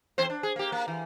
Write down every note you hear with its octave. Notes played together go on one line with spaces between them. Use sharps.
E2 C4 C5
D4
G#4
A#3 G4
A#3
E3